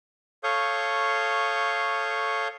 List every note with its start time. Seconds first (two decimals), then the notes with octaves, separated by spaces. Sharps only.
0.44 A4 C#5 F5 C#6 D#6 G6